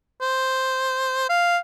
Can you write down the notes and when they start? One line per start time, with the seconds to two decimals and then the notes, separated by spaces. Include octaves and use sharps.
0.21 C5
1.30 F5